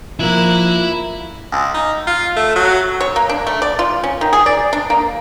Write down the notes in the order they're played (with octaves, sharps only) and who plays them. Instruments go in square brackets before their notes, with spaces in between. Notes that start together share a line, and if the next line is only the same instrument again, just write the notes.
[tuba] F3 [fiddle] A#3 F#6 [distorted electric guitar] E4
[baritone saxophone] C#2
D#4
F4
A3
F#3
[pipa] C#5
A#3
D4
A3
D5
F4
C#4
D#3
G#4
D5
D4
A#3